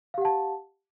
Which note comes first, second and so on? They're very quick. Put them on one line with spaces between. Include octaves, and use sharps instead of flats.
F5 G4 F#5 A5